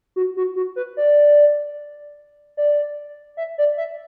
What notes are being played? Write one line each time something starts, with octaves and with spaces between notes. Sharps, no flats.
F#4
F#4
F#4
B4
D5
D5
E5
D5
E5